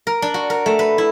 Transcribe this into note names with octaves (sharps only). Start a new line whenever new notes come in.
A#4
D4
F#4
A#4
A3
B4
E4